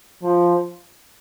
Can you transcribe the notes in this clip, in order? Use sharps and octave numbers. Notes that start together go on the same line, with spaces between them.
F3